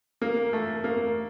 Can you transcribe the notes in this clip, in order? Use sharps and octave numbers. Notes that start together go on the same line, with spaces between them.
A#3
A3
A#3